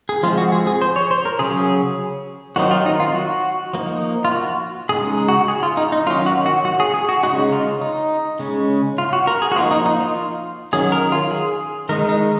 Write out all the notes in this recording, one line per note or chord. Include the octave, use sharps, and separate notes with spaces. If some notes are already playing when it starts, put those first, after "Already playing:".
G#4
F3 G#3 C4 F4
F#4
G#4
G#4
C5
C#5
C5
A#4
C#3 F#3 C#4 G#4
D#3 F#3 C4 D#4 F#4
F4
D#4
F4
F#4
F3 A#3 D#4
F4
F#4
C#3 G#3 D#4 G#4
F#4
G#4
F4
D#4
D#4
D#3 F#3 C#4 F4
F#4
F#4
F#4
G#4
G#4
F#4
C#3 G#3 D#4 F#4
F4
D#4
C#3 G#3 C#4
F4
F#4
A#4
G#4
F#4
F3 A#3 D#4 F4
D#4
D#4
F4
D#3 F#3 C#4 G#4
A#4
F4
G#4
D#3 G#3 D#4 A#4
D#4